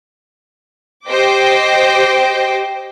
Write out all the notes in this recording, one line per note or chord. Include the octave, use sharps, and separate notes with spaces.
G4 C5 D#5 G5 D6